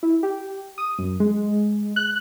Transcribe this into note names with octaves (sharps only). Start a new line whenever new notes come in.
E4
G4
D#6
F#2
G#3
F#6